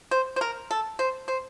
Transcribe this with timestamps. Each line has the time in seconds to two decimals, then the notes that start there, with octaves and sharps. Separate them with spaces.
0.11 C5
0.36 C5
0.41 A#4
0.71 A4
0.99 C5
1.28 C5